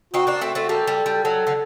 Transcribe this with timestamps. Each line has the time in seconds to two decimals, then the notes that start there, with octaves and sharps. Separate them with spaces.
0.14 C4 D#4 F#4
0.27 A#3 D4
0.41 A3 C4
0.55 A3 C4
0.69 G3 A#3 A4
0.87 G3
1.06 G3
1.24 F#3 A4
1.47 D3